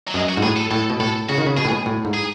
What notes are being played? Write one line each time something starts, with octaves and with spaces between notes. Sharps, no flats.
F#3
F#2 G#3
F#4
G#2
A2 G#4
A4
A2 A4
B2
A2 A4
C#3 F#4
D#3
C#3
B2 G#4
A2
B2
A2
G#2
G#4